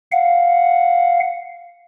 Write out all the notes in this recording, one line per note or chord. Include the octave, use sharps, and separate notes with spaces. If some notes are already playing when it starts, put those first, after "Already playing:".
F5 F#5